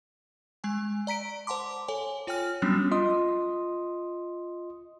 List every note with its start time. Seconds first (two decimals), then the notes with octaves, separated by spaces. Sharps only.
0.64 G#3 G#5
1.07 D5 A#5 B6 D7
1.47 C5 F#5 A5 C6 D6
1.88 A4 C#5 G#5
2.27 F4 C#5 G5 G#5 F6
2.62 F#3 G3 B3 C#4 D4 F#4
2.91 F4 D#5 C6 D#6